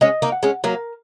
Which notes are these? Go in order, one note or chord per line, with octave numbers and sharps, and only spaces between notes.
G#3 C#4 D#5
A#3 D#4
F#5
G#3 C#4
F#3 A#3 A#4